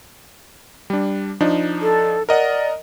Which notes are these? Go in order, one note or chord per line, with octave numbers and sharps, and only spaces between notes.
G3 D4
F3 D4 D#4
A4
A#4 D5 D#5 F#5